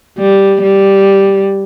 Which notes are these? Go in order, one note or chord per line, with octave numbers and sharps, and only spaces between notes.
G3
G3